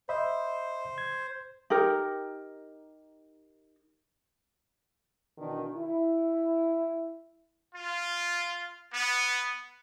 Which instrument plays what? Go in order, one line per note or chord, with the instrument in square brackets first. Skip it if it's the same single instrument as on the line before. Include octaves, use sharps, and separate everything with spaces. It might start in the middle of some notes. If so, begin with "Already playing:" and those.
[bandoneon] C5 [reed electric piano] D#5 E5 B5
[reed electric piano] G#6
[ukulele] D#4 G4 A#4
[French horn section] B2 D#3 E3 D4
E4
[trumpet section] F4
B3